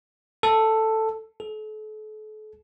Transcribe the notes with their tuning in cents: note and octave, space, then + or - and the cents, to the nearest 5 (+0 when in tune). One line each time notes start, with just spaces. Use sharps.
A4 +5
A4 -40